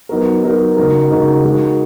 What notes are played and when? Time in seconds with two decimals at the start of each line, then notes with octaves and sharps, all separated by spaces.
0.09 F#3 B3 D#4 F#4 A#4
0.43 F#3 B3 D#4 F#4 A#4
0.77 C#3 G#3 D#4 F#4 A#4
1.10 C#3 G#3 D#4 F#4 A#4
1.44 G#3 D#4 F#4 A#4